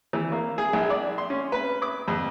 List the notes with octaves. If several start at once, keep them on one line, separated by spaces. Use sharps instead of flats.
E3
A#3
G#4
A#1
D5
C6
C#4
B4
D6
F2